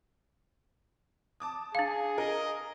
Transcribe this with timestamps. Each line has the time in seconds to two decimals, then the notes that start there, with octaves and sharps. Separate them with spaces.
1.40 A5 D6 D#6
1.75 D4 G#4 F5
2.18 A#4 D#5